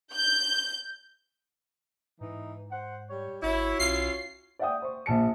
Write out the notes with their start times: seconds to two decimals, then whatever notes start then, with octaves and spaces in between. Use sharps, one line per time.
0.14 G6
2.21 G#2 E3 D#4
2.71 C5 F#5
3.10 G3 C#5
3.43 G#1 E4 F#4 C#5
3.79 B1 C#4 E4 F4 C7
4.59 D5 E5 F#5 G5 D#6
4.82 C5 C#6
5.06 A#1 A5 C#7